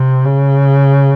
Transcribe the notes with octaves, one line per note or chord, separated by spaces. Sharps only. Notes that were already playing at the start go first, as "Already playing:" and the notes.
Already playing: C3
C#3